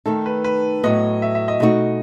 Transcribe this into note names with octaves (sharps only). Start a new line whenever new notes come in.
D#3 A3 D#4 A4
B4
B4
A2 F#3 B3 D#5
E5
E5
D#5
B2 A3 D#4 F#4 D#5